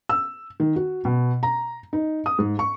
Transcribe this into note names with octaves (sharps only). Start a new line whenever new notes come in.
E6
D#3
F#4
B2
A#5
D#4
D#6
G#2
C#6